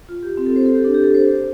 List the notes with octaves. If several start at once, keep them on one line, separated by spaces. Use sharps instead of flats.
F4
G4
C4
A4
C5
A4
G4
D4
G4
A4
C5